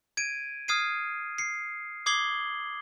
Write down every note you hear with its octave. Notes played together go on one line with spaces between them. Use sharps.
G#6 D7 D#7
D#6 F6 G#6 C7 D#7
C7 C#7
D6 D#6 G#6 C7 F#7 G7